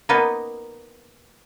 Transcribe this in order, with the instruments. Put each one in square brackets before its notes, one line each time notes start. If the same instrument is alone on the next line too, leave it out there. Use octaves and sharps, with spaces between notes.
[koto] A#3 B3 D#4